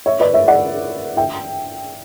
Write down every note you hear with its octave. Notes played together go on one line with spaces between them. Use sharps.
C#5 E5
B4 D5
C#5 E5
D5 F#5
E5 G5